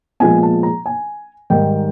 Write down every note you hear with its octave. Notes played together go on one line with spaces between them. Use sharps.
A#2 F3 G#3 B3 G#5
A5
A#5
G#5
G#2 D#3 G3 G5